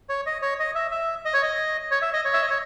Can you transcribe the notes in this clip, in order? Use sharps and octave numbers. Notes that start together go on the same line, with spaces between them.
C#5
D#5
C#5
D#5
E5
E5
D#5
C#5
D#5
C#5
E5
D#5
C#5
E5
D#5
C#5